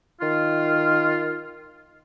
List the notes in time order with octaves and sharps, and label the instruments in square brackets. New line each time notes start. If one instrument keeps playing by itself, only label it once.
[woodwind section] D#3 F4